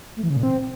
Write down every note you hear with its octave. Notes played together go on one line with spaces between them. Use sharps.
A3
E3
C#3
A#2
C4